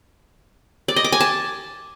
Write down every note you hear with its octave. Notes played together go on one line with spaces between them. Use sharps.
D5
D#5
D6
G#5
A5